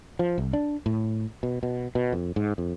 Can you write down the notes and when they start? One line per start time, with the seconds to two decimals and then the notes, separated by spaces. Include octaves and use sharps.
0.19 F3
0.38 C2
0.53 D4
0.86 A2
1.43 B2
1.63 B2
1.95 B2
2.13 F2
2.36 G#2
2.58 F2